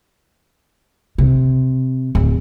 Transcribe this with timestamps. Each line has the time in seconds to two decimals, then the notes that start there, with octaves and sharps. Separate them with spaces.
1.18 C3
2.15 D1